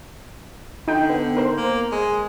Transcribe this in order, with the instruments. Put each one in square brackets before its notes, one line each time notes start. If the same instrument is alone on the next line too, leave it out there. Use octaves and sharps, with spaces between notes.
[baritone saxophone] D3 [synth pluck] D#4 G5
[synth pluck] B3
A#4 C5
[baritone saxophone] A#3
G#3